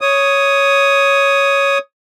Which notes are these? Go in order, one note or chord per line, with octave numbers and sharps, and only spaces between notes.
C#5 D#6